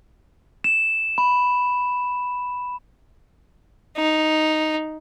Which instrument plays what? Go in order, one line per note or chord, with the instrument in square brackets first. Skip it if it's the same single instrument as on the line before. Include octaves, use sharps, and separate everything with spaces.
[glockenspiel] E7
B5
[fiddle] D#4